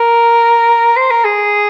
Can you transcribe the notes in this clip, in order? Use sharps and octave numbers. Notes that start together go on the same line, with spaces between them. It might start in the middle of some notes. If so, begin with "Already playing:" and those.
Already playing: A#4
C5
A#4
G#4